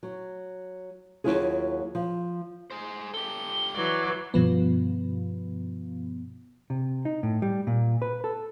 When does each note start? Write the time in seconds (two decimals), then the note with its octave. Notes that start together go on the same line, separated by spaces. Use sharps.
0.03 F#3
1.24 D#2 A2 F#3 E4 F4 G#4
1.95 F3
2.71 G#4 C5
3.14 G4 A4 G7
3.75 E3 F#3 D5
4.34 G2 B2 F3 B3
6.70 C3
7.05 D#4
7.23 A2
7.42 G3
7.67 A#2
8.02 B4
8.24 A4